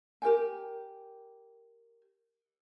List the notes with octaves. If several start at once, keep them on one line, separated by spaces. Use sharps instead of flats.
G4 A#4 G5 G#5